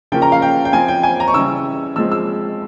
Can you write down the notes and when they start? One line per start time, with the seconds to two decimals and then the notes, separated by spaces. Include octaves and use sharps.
0.12 C#3 F3 A#3 C#4 G5
0.22 A#5
0.32 F5
0.42 G5
0.65 G5
0.73 F3 C4 G#5
0.88 G5
1.03 G#5
1.20 A#5
1.28 C#6
1.34 C#3 E3 G3 E6
1.96 F3 G#3 C4 E6
2.12 E6